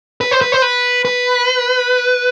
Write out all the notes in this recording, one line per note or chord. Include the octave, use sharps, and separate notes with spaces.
B4
C5
B4
C5
B4
B4